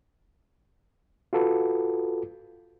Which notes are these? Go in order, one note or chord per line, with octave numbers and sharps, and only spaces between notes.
F4 F#4 A4 B4